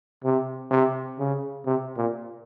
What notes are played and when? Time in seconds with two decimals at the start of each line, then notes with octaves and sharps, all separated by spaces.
0.24 C3
0.71 C3
1.19 C#3
1.66 C3
1.97 A#2